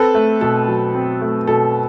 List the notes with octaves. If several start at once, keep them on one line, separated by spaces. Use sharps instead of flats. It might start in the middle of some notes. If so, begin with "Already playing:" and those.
Already playing: C4 A4 B4
A3
B2 A4
F#3
C4
A3
B2 A4